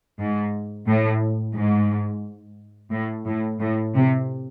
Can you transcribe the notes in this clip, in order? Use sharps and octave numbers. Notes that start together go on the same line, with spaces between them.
G#2
A2
G#2
A2
A2
A2
C3